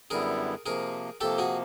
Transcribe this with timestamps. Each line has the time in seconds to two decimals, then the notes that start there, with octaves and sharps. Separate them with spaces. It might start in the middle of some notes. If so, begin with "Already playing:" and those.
0.10 F#2 D3 G3 B3 E4 G#4 A#4
0.66 C3 F3 A#3 G#4 A#4
1.21 C3 F3 A#3 G4 A4
1.38 F#4 G#4